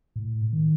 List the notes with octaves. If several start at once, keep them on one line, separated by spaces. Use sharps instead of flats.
A2
D#3